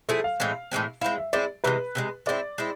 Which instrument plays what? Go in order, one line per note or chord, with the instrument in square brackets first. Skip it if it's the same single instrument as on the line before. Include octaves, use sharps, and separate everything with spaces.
[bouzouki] F3 A3 E4 G#4 [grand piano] A4
[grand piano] F5
[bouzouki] A2 E3 G#3 C4
A2 E3 G#3 C4
[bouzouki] G#3 C4 E4 [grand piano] F5
[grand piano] E5
[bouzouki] G#3 C4 E4 [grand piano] D5
[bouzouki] C3 E3 G#3 [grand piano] B4
[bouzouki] C3 E3 G#3
[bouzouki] G#3 C4 E4 [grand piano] D5
[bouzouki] G#3 C4 E4